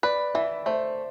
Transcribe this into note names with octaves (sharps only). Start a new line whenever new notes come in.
B4 D5
E3 E5
A3 C5